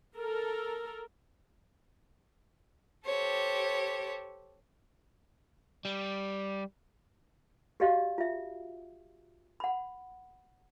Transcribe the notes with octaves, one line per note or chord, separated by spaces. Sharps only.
A4 A#4
G4 A4 C5 C#5
G3
F#4 G4 D5 D#5 F5
F4 E5
F#5 B5